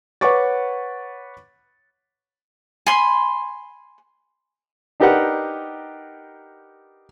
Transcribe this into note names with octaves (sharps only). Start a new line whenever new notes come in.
B4 C#5 F#5 C#6 D6 A6
G#5 B5 C6
D4 D#4 G4 A#4 B4 F#5